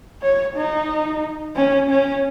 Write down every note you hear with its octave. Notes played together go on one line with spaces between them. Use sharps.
C#5
D#4
C#4
C#4